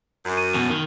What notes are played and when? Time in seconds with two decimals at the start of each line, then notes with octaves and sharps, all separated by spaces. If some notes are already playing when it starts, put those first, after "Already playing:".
0.26 F#2
0.37 D#7
0.54 E2 B2
0.70 D#3